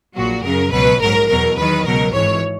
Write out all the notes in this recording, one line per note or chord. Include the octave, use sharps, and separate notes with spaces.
A#1 A#2 F#3 F#4
F#2 C#3 F#3 A#4
C#2 B2 F#3 B4
A#1 G#2 F#3 A#4
E2 B2 F#3 A#4
E2 D#3 F#3 B4
C#2 B2 F#3 A#4
G#1 G#2 E3 C#5